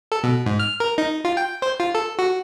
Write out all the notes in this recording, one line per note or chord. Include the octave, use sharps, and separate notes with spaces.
A4
B2
G#2
F6
A#4
D#4
F4
G5
C5
F4
A4
F#4